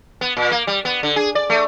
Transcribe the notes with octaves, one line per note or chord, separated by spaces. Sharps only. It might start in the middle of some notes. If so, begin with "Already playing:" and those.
B3
A#2
A#3
G3
B3
D3
G#4
D5
A3